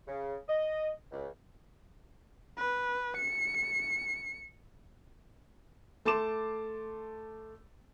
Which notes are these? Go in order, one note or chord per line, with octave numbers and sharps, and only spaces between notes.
C#3
D#5
C#2
B4
C#7
A3 A5 C6 D6 E7